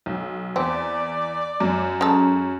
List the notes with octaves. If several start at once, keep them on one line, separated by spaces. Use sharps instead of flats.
B1
E2 C4 D5
F#2
G#3 C#4 A4 A#5